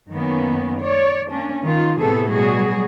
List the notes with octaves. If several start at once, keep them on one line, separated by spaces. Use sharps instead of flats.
F#2 D#3 A#3 B3 C#4
C#5 D5
A#3 C#4 D4
D#3 F4
A2 C3 A3 B3 G#4 A4
B2 F#3 G3 F#4 G#4